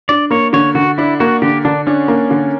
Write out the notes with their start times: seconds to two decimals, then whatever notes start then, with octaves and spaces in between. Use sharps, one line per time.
0.09 D4 D5
0.31 A#3 C#5
0.53 D3 C#5
0.75 D3 F#4
0.98 D4 E4
1.20 A#3 F#4
1.42 D3 G4
1.65 D3 D4
1.87 C#4 D4
2.08 A#3
2.31 D3